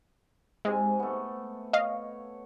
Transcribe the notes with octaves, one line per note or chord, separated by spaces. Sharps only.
G#2 C3 G#3 G#5
A3 B3
C#5 D#5 F5